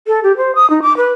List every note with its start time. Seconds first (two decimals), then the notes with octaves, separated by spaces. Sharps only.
0.07 A4
0.23 G4
0.37 C5
0.55 D#6
0.70 D#4
0.82 D6
0.97 B4